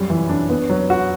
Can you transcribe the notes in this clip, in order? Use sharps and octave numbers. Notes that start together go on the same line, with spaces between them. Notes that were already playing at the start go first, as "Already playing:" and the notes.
Already playing: F#2 G3
E3
D4
B3
F#3
F#4